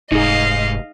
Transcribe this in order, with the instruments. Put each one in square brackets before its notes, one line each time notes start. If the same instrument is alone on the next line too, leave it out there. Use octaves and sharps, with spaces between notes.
[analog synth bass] F1 [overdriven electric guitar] G#2 [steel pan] D#4 G#4 [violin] D#5 F5